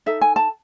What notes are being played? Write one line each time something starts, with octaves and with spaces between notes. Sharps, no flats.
D#4 A4 E5
G#5
A5